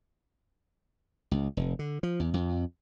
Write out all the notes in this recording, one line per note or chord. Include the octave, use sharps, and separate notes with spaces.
C#2
F1
D3
F3
E2
F2